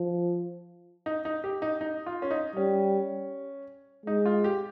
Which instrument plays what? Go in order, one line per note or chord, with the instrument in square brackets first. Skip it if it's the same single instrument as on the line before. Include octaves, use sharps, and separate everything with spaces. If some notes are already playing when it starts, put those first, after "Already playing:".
Already playing: [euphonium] F3
[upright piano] D#4
D#4
G4
D#4
D#4
F4
C#4
D#4
[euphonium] G3 [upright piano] C#4
[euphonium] G#3 [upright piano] D#4
[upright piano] F4
G4